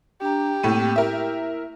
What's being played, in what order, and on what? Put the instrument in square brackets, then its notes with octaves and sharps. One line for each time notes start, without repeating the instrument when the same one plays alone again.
[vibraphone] D4 A#5 [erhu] G4
[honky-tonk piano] A2 A3 D#7 [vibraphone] A#3 C4
[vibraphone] E4 [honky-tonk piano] A#4 E5